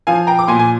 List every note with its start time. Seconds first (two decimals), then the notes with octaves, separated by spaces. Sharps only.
0.07 F3 F5 G#5
0.27 G5 A#5
0.39 D6
0.48 A#2 G#5 C6
0.59 G#5